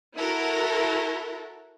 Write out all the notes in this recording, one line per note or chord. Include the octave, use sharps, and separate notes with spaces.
E4 F#4 A4 A#4